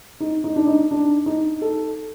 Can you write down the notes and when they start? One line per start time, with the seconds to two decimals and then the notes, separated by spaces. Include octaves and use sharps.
0.20 D#4
0.44 D#4
0.56 D4
0.67 D#4
0.91 D4
1.26 D#4
1.61 A4